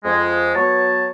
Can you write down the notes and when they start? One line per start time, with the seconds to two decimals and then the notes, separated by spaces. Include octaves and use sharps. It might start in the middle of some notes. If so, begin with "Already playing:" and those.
0.05 F2 G#3
0.55 F#3 B3 C#5 A5